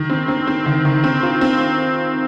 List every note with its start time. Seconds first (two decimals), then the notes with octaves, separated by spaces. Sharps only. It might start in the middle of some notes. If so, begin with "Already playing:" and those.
Already playing: D#3
0.10 C4
0.28 C4
0.47 C4
0.66 D#3
0.85 D#3
1.04 C4
1.23 F4
1.41 C4